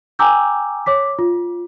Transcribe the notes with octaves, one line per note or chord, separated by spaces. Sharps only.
G5 G#5 A#5 D6 E6 G6
C#5 D6 B6
F4